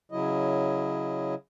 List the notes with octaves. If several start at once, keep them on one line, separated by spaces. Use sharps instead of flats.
C#3 F#3 E4 D#5